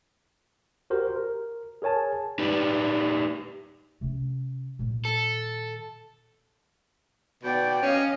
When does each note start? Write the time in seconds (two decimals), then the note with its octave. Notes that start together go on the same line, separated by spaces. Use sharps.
0.90 F#4 G4 A#4 C5
1.16 A#4
1.82 G#4 A#4 C#5 G#5 A5
2.39 D#4 G4 B4 D5
4.01 C3 C#4
4.79 A#2 D#3
5.05 A4
7.43 B2 D5 G5
7.83 C#4 D#5 F5